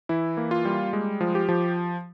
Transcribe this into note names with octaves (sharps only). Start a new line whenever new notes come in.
E3 E4
A#3
F4
G3
G#3
F3
G4
F3